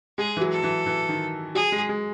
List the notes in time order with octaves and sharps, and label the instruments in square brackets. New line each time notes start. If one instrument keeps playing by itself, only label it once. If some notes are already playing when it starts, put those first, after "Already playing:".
[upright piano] G#3 [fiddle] G#4
[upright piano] E3
F#3
[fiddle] A4
[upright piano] E3
E3
D#3
[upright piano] F#3 [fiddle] G#4
[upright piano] G#3
G#3